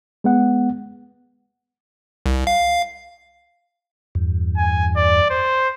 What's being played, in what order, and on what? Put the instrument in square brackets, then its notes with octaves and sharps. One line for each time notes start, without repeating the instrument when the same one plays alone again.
[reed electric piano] G#3 B3 F#5
[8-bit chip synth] C2
F5
[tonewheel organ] E2 G2
[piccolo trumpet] G#5
D5
C5